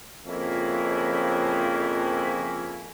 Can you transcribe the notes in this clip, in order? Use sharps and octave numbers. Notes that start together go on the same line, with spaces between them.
F2 C#3 F3 A#3 C#4 E4